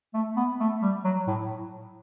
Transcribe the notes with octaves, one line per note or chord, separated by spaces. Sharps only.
A3
B3
A3
G3
F#3
A2